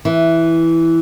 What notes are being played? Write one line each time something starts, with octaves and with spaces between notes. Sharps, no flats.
E3